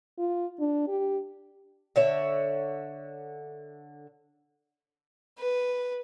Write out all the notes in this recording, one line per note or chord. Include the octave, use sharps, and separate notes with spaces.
F4
D4
G4
D3 C#5 E5
B4